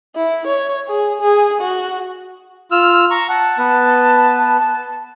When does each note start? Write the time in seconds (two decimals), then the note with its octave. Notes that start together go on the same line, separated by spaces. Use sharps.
0.16 E4
0.47 C#5
0.88 G#4
1.21 G#4
1.61 F#4
2.71 F4 E6 F6
3.11 A#5 C#6
3.28 F#5 A5
3.58 B3 B4